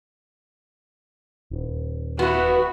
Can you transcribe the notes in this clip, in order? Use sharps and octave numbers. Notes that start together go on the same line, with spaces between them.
D#1
B3 E4 F#4